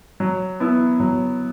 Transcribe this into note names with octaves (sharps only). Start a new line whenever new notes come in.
F#3
B3 E4
F#3